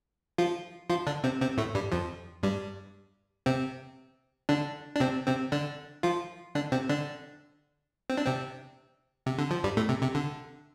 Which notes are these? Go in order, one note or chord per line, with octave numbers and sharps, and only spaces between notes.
F3 F4
F3 F4
D3 D4
C3 C4
C3 C4
A2 A3
G2 G3
F2 F3
G2 G3
C3 C4
D3 D4
D4
C3 C4
C3 C4
D3 D4
F3 F4
D3 D4
C3 C4
D3 D4
C4
D4
C3 C4
C3
D3
F3
G2 G3
A2 A3
C3
C3
D3